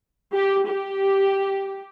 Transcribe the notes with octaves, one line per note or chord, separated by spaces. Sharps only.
G4
G4